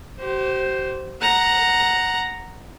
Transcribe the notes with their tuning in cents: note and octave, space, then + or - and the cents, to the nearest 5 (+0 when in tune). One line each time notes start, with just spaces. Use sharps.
G4 -40 C5 +0
F#5 +0 A#5 +0